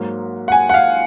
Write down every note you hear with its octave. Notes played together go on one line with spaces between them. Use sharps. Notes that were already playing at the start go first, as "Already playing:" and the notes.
Already playing: G#2 F#3 A#3
F#5
G#5
F#5
F5